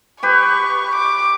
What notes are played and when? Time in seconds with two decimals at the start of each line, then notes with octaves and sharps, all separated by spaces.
0.23 G4 B4 C#6
0.95 D6